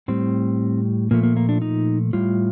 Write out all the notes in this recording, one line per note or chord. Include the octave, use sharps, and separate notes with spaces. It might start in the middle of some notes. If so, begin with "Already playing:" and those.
A2 G3 C4
A#2 F3 A3 A#3
A#3
A#3
D4
D#4
A2 G3 F4